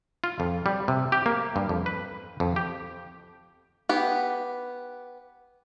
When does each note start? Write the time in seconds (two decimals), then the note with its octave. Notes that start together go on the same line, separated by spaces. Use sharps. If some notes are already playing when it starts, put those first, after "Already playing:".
0.24 F4
0.40 F2
0.66 G3
0.88 C3
1.12 G4
1.26 A#3
1.56 G2
1.69 F2
1.86 B4
2.40 F2
2.56 G4
3.89 B3 G4